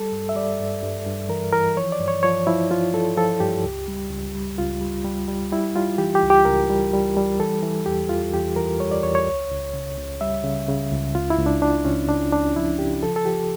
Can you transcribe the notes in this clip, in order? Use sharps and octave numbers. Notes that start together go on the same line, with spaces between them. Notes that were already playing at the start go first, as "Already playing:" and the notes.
Already playing: G3 A4
G2
E5
G3 D5
G2
G2
G2
E3 A#4
E3 A#4
F3 C#5
D5
G2
C#5
F3 C#5
F3 E4
F3 F4
F3 A4
F3 A4
G2 G4
C#2
G3
C#2
G3
C#2 F4
G3
G3
G3
G3 E4
G3 F4
E3 G4
G4
C#2
G4
C#2 A#4
G3
G3
G3
E3 A4
E3
E2 G4
E2 F4
E2 G4
E3 A#4
G3 C#5
D5
E2 C#5
C#5
C#2
C#2
C#3
C#2
G3 E5
C#3
C#3
C#2
C#2 F4
E4
C#2
D4
C#3 D4
C#2 C#4
C#2 D4
C#2 D4
F3 E4
C#3 G4
F3 A4
A4
F3 G4